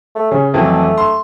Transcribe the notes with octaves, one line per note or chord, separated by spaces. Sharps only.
A3
C#3 C#4
F2 E3 F#3 A3
C6